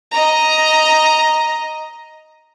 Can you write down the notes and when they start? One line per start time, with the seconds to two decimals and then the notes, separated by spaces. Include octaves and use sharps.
0.11 D#5 A#5